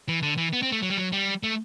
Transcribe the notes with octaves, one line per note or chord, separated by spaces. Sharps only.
E3
D3
E3
B3
C4
A3
F#3
G3
F#3
G3
A3